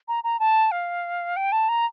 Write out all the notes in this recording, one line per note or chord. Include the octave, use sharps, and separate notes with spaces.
A#5
A#5
A5
F5
G5
A5
A#5